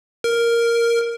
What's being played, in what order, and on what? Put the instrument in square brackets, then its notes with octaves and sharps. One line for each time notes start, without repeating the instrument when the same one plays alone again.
[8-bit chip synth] A#4